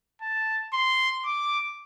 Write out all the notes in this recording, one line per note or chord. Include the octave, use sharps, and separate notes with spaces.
A5
C6
D6